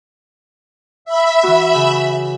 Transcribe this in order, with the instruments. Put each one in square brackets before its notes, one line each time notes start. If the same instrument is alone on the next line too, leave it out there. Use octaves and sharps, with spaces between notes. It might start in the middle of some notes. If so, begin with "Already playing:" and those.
[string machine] E5 B5
[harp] E3 F#4
C#3